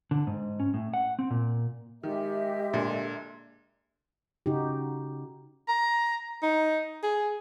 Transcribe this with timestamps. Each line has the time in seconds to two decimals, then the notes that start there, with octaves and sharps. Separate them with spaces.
0.11 D3
0.27 G#2
0.60 C#4
0.74 A2
0.94 F#5
1.19 C4
1.31 A#2
2.03 D#3 G#3 G4 D#5 E5
2.74 A#2 D3
4.46 C#3 D#4 F#4 G4
5.68 A#5
6.43 D#4
7.03 G#4